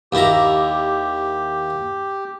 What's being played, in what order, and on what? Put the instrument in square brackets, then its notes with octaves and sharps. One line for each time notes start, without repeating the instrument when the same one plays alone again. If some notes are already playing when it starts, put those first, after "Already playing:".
[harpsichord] D#2 E4 A#5 [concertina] G4